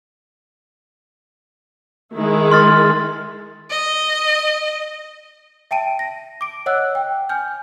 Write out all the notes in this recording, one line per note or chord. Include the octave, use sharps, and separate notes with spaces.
D#3 G#3 E4
C6 F6 A6
D#5
E5 G5 A5 D7 D#7
A#6
D6 D7
C#5 D#5 F#5 E6 F#6
G5
G#5 F6 G6